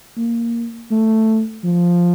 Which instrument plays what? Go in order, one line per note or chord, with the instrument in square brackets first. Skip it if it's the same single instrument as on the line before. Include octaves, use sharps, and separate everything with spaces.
[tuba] A#3
A3
F3